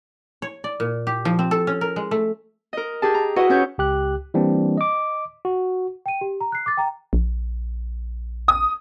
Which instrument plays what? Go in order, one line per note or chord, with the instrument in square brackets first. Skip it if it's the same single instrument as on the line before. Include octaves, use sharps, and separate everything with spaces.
[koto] C#5
D5
A#2
G4
F3
C4
A4
C#4
A#4
G#3
A3
[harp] A#4 D#5
G4 G#4 A5
A#5
E4 F#4 B4 D#5 F#5
C#4 B4 C#5 G6
[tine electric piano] C#2 G4 F#6
E3 G3 A#3 C4 D4
D#5 D6
F#4
[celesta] G5 D#7
G4
A#5
F#6 C7
D6 A6
G5 A#5
[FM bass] A#1
[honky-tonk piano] D#6